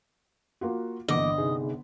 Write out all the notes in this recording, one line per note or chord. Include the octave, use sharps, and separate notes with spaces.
A#3 F4 F#4
G1 D3 E3 A#3 D#5 D6
C3 D#4 G#4